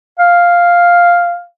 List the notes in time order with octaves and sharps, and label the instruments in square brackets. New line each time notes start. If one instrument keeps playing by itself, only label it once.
[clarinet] F5